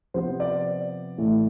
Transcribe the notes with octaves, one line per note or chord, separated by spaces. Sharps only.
C3 F3 B3 C5
D5
A2 E3 A3